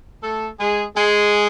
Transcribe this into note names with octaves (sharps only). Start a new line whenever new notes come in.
A3 A4
G#3 G#4
G#3 G#4